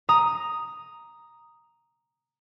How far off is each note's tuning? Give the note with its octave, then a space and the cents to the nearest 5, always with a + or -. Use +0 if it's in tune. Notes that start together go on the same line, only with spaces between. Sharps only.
A#5 +0 D#6 +0